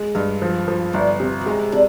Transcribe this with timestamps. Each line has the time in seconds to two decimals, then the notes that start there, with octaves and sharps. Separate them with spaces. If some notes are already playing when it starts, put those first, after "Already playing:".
Already playing: G#3
0.15 G2 D#4 F4
0.42 F3
0.68 F3
0.93 G1 D4 E4
1.20 C3
1.41 F#4
1.46 G#3 D#4 F4
1.72 C3 D4 E4